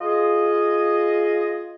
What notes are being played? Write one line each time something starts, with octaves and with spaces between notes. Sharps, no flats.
F4 G#4 D#5